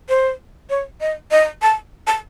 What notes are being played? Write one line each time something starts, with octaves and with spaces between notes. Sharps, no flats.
C5
C#5
D#5
D#5
A5
A5